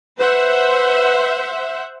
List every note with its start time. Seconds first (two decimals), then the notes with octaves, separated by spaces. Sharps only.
0.19 B4 C5 E5 F#5